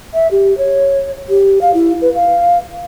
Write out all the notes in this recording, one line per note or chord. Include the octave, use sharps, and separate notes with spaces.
E5
G4
C#5
G4
F5
E4
B4
F5